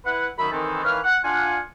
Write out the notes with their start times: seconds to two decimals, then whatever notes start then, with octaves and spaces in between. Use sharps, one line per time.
0.06 E4 B4 F#5
0.38 F#2 D#3 F#3 E5 B5
0.51 D#3 E3 C4 A4
0.84 D#3 E3 B4 C#5 F5 F6
1.04 F#5
1.24 D4 F4 F#5 G#5